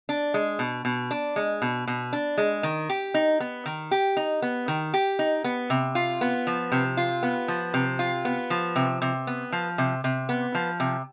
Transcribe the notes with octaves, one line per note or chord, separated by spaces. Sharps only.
D4
G#3
B2
B2
D4
G#3
B2
B2
D4
G#3
D#3
G4
D#4
B3
D#3
G4
D#4
B3
D#3
G4
D#4
B3
C3
F4
B3
F3
C3
F4
B3
F3
C3
F4
B3
F3
C3
C3
B3
F3
C3
C3
B3
F3
C3